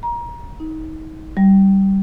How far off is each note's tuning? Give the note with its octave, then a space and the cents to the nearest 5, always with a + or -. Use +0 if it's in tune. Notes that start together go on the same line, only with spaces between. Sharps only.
A#5 +25
D#4 +25
G3 -15